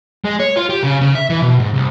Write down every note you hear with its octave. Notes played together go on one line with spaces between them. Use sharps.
G#3
C#5
F4
G4
C#3
C#3
E5
E3
B2
G#2
C2